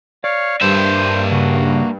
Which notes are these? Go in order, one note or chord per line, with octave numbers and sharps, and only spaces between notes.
C#5 D5 F5
G2 A#3 C5 E5
C#3 F#4